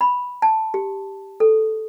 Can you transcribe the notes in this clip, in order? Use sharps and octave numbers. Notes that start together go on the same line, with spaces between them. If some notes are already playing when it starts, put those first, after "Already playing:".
B5
A5
G4
A4